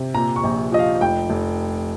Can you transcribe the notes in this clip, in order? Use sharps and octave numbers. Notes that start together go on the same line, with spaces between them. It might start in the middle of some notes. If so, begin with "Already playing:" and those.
Already playing: C3
A#2 A#5
C#6
A#1
F3 D#5
F5
F1 G5
F1